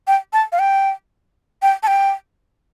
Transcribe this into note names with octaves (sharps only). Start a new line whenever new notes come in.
G5
A5
F5
G5
G5
A5
G5